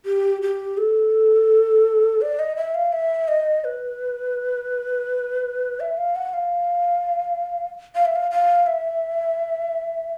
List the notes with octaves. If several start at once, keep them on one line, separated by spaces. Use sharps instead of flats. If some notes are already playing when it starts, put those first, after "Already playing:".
G4
G4
A4
D5
D#5
E5
F5
E5
D#5
B4
E5
F5
F#5
F5
F5
E5
F5
F5
E5